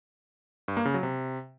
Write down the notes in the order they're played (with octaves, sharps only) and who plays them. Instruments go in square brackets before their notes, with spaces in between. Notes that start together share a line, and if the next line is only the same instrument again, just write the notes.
[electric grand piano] G2
A#3
C#3
F#3
C3